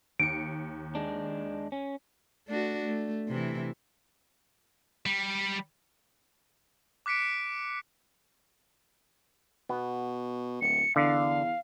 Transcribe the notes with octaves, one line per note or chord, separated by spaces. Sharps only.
D#2 C#7 D7
G#3 D4
C#4
A3 D4 F#4
A3
C3 E3 E4
G3
D6 F#6 B6 C#7 D7
B2 B3
D1 C#7
E2 D3 F5